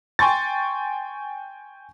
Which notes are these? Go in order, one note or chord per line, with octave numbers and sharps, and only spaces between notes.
G5 G#5 C6 C#6 A6